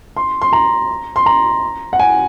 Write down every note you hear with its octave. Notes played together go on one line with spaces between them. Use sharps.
C6
C6
A#5
C6
A#5
F#5
G#5